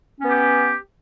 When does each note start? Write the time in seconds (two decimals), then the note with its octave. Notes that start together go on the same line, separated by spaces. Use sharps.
0.20 C#4
0.24 B3
0.28 G4